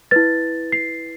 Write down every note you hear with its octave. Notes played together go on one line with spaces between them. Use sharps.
E4 B4 A6
C7